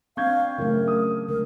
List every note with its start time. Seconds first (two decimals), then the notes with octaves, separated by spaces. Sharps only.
0.17 C4 D4 F5 C#6 G6 G#6
0.58 A1 C#3 F#3 A3 A#4
0.88 D#6
1.29 D3 G#3 A3 A#4